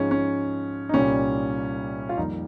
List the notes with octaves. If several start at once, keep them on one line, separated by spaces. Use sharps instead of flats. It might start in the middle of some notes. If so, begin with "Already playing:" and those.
Already playing: G#2 F3 G#3 C#4
C#4
D#4
C2 A#2 G3 C#4
F4
F2 D#3 G3 A#3 D#4